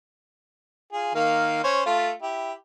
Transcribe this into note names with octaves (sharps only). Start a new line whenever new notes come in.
F4 G#4
D#3 A#3 F5
C#4 C5 C#5
A3 F4
E4 G4